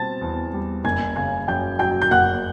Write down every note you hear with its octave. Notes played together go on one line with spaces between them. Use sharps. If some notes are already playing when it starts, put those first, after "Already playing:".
Already playing: B2 G3 C4 A5 A6
E2
G3
F#1 G#5 G#6
C#3 G#5 G#6
F#2 G5 G6
F#3 G5 G6
G6
F#1 F#5 F#6